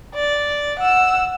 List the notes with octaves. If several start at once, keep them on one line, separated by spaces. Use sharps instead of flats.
D5
F#5 E6